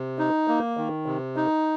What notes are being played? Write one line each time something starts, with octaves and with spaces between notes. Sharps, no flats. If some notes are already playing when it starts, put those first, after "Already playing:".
Already playing: C3
D#4
A#3
D#3
C3
D#4